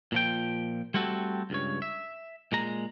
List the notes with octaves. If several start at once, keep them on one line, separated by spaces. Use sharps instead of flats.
A#2 F3 G5
G3 A3 C4 F#4 A4
C#2 G2 C#5
E5
A#2 G#3 A#5